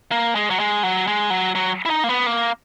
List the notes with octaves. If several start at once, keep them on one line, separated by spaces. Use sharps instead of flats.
A#3
G#3
F#3
G#3
F#3
G#3
F#3
F#3
E4
D#4
A#3
B3
A#3